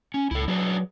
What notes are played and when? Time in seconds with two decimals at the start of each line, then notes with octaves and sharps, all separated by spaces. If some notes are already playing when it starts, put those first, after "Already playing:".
0.14 C#4
0.31 C#2 E4 A4
0.48 F#3 D4 G#4 B4